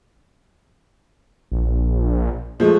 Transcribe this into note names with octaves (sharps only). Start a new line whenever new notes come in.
A#1
F3 G#3 A3